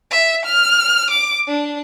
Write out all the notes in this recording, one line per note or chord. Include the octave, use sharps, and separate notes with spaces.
E5
F6
D6
D4